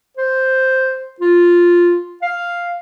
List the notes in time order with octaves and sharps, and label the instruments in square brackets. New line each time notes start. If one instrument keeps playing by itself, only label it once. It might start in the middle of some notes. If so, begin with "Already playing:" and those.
[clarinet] C5
F4
F5